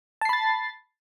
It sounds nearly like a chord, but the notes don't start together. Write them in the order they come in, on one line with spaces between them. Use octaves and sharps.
A5 C7 B5 A6